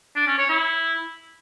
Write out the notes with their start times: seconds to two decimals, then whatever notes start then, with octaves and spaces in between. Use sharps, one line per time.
0.16 D4
0.27 C#4
0.38 C#5
0.49 E4